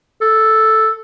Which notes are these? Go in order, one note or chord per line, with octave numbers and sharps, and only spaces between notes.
A4